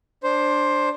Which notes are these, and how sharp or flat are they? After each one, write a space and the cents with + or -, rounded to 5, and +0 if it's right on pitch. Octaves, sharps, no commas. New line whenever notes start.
D4 +0 C5 +10